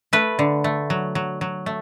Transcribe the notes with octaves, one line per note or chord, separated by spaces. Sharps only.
A3 B4
D3
A3
F#3
F#3
F#3
A3